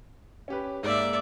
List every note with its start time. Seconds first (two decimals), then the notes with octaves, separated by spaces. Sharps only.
0.48 C#4 G4 B4
0.83 G#2 A#3 D5 E5